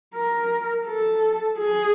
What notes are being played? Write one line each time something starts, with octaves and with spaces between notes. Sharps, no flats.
A#4
A4
G#4